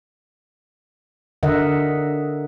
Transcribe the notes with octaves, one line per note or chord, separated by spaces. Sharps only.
D3 A#4 D#5 E5 F#5